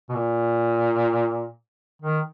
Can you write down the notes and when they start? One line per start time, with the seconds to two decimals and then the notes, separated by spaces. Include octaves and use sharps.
0.09 B2
0.15 A#2
2.02 D#3